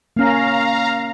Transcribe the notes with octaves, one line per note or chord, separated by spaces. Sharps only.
A#3 C#4 F5 A#5